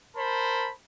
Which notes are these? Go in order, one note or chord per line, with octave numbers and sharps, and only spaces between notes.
A#4 C5 A5 B5